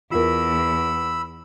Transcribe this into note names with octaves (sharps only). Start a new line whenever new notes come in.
E2 F4 A#4 B5 E6